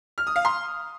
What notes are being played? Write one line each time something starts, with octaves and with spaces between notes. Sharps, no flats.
F6
D#6
F5
C6